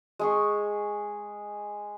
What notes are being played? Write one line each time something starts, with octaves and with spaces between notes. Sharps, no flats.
G#3 G#4 C#6